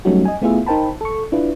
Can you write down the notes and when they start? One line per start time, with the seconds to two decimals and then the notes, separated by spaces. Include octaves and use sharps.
0.05 F#3 G3 A3 C#4 D#4 F#4
0.25 D#5 G#5
0.42 A3 B3 E4 F4 G#4 E5
0.66 D#4 A#4 C5 G5 A5 B5
1.01 A4 C#6
1.32 D4 E4 F4 B4